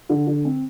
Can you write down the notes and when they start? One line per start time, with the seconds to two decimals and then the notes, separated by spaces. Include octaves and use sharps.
0.09 D3
0.27 D3
0.45 C4